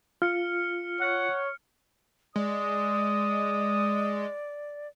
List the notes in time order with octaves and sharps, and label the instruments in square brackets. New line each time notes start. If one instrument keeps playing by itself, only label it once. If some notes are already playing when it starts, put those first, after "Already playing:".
[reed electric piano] F4 [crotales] F6 C#7
[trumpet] C#5 [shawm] F#5
[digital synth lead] G#3 [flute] D5 [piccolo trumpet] D#6